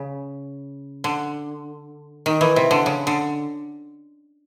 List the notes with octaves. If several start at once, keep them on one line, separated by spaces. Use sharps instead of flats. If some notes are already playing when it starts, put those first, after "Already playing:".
Already playing: C#3
D3
D#3
E3
C3
D3
C#3
D3